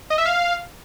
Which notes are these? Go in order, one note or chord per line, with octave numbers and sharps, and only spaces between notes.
D#5
E5
F5